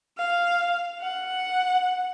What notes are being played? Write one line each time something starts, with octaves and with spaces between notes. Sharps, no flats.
F5
F#5